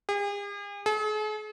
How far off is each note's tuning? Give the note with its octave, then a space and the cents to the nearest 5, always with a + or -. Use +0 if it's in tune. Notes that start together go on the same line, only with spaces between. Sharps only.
G#4 -45
G#4 +45